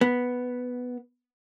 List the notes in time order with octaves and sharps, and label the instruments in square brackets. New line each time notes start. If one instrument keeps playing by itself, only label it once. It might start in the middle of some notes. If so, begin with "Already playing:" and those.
[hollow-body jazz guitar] B3